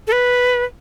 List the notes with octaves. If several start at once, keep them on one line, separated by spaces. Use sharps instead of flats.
A4
B4